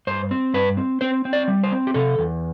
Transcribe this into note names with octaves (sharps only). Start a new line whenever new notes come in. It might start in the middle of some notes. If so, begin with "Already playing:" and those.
G2 C5
C4
G2 B4
C4
C4 C5
C4
D5
G3
C5
C4
G4
C3 A4
E2